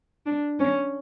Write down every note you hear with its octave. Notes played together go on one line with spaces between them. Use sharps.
D4
C#4